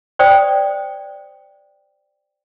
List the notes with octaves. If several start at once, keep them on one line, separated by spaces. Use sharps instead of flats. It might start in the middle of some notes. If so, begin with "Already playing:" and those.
C5 D5 G5 D#6